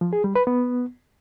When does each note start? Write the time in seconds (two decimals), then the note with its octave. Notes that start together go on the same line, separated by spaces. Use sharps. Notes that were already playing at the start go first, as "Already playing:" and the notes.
0.01 F3
0.13 G#4
0.24 G3
0.35 B4
0.47 B3